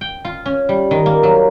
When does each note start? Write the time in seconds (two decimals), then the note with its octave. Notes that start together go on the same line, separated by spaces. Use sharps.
0.01 G5
0.25 F4
0.46 C#4
0.69 G3
0.91 D#3
1.06 A#3
1.23 F#3